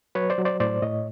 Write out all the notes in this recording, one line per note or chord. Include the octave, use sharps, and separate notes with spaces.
F#3 B4 C#5
C5 D5
F#3
C5 D5
A2 C5 D5
A2 C#5 D#5